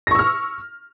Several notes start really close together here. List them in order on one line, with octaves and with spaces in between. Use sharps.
A#6 C#6 E6 F6